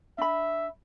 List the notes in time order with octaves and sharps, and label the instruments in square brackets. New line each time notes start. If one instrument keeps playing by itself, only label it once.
[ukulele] D4 B5 [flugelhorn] E5